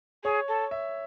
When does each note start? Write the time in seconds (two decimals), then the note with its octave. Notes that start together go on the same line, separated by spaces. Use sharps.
0.24 G#4 C#5
0.48 A4
0.71 E5